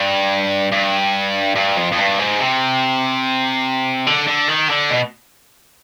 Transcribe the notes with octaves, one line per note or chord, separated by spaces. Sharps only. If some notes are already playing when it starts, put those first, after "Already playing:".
Already playing: G2
G2
G2
F2
F2
G2
G#2
C3
D3
D3
D#3
D3
B2